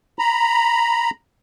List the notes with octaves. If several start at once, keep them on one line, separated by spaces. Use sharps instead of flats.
A#5 B5